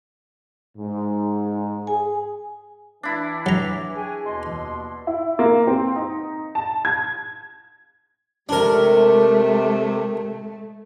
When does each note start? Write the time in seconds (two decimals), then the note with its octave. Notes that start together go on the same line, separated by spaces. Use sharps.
0.76 G#2
1.87 G#4 G#5
3.03 E3 D4 E4
3.46 F#3 A#5
3.95 G#4 C#5 G5 G#5
4.24 D#2 B2 D#5 C6
5.07 E4
5.39 A#3
5.67 C4
5.96 D#4
6.55 A5
6.85 G#6
8.49 C3 G#3 A3 D4 A#4